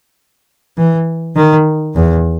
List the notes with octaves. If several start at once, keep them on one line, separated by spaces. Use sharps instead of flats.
E3
D#3
E2